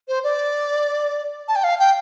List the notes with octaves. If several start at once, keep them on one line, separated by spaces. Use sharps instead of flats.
C5
D5
A5
G5
F5
G5